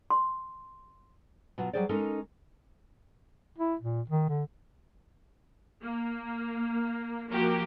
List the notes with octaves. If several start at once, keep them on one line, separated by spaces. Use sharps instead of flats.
C6
B2 F#3 F4
F#3 G3 G#4 C5 D5
G#3 C#4 D#4 A4 A#4
E4
A#2
D#3
D3
A#3
F3 A#3 F#4 G4 A#4